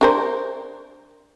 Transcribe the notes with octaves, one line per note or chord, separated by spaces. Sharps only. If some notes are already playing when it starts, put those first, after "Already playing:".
D4 A#4 C5